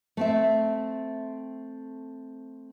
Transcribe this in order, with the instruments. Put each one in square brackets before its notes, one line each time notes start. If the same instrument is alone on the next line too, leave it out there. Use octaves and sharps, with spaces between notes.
[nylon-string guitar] A3 C4 E5